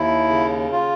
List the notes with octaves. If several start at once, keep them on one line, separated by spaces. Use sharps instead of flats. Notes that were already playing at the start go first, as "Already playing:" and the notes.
Already playing: D#2 E4
C#3
F4